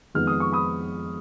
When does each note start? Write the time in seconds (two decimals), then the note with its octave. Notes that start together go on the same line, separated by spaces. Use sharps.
0.14 F2 D#3 G#3 B3 F6
0.27 D#6
0.40 C#6
0.53 B5 D#6